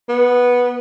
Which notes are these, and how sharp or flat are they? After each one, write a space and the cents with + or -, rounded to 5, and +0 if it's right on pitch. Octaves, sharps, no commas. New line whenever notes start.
B3 -10